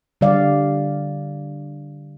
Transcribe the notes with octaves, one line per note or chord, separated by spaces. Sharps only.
D3 G3 D5 F5